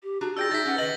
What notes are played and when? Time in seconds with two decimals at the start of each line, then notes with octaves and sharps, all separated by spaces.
0.03 G4
0.21 D4 F#4 G#4 A#5
0.37 F4 G#4 D5 G5 E6 G6 A#6
0.51 G3 D#4 E5 A6 B6
0.65 C#4 G4 B4 F#5
0.78 D#3 B4 D#5 A6 A#6 F#7